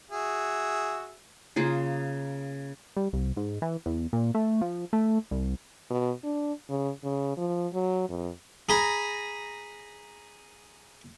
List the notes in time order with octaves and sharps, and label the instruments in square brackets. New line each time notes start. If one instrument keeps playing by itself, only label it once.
[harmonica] F#4 G#4 E5
[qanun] C#3 A#3 F4 G#4
[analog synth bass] G3
C2
G#2
E3
E2
A#2
A3
F3
A3
C2
[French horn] B2
D4
C#3
C#3
F3
F#3
F2
[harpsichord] G#4 A#5 B5